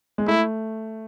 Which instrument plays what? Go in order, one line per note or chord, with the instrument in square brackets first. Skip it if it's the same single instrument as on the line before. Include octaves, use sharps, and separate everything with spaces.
[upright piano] G#3
[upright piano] A3 [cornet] E4